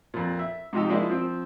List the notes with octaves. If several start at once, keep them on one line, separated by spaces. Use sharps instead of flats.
F2 A#2
E5
G#2 C3 F3 D#4 G4 E6
F3 G#3 A#3 D4 E4
F3 C4